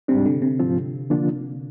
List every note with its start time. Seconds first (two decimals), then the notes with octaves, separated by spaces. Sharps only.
0.08 G#2 C3 G3 D4
0.26 D3
0.42 C3
0.59 G#2 F3 C4 F4
1.10 D3 F3 A#3 D4 F4